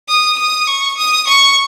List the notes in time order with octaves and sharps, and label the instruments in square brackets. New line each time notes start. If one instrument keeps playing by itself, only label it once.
[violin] D#6
D#6
C#6
D#6
C#6